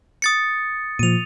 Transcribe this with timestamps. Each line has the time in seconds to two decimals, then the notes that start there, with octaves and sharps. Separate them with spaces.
0.22 D#6 A6 C#7
0.99 A#2 F3 D#7 F7